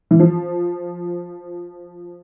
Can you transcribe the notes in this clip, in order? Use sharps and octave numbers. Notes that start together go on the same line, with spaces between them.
E3
F3